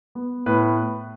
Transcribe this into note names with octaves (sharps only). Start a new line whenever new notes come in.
B3
A2 B4